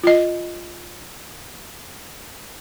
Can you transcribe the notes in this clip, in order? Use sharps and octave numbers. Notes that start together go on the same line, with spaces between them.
F4 D#5